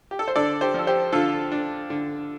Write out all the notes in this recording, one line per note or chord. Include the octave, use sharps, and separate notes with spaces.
G4
A4
C5
D3 A4 D5
G4 C5
F3 A4
G4 C5
D3 F4 A4
D4
D3